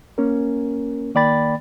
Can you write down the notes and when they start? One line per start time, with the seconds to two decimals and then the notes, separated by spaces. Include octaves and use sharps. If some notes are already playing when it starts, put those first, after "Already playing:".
0.18 A#3 C#4 A#4
1.15 D#3 A#3 D5 G5 B5 A6